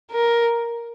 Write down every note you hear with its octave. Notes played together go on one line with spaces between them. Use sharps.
A#4